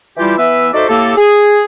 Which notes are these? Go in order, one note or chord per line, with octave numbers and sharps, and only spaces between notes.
E3 G3 E4 F4 G4
E3 B3 B4 E5
D#4 F#4 A4 C5 D5 E5
A2 A#3 G4 A4
G#4